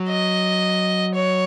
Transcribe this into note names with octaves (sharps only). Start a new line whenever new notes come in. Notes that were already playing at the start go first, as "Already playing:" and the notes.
Already playing: F#3
D#5
C#5